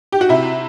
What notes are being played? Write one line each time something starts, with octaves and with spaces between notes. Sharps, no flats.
G4
F#4
C3 E4